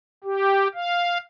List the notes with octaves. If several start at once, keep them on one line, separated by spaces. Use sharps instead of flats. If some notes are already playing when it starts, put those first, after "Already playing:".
G4
F5